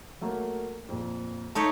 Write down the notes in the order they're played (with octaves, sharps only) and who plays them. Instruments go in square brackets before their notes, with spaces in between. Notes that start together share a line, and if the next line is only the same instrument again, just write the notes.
[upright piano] F#3 A3 A#3
F2 A#2
[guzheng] A3 D#4 C#5 [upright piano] A5 G6 B6